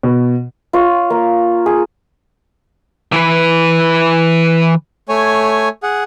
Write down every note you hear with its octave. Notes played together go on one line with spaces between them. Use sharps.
B2
F4 C#5
A#3
G#4
E3 B4
A3 C#5 G#5
G#4 F#5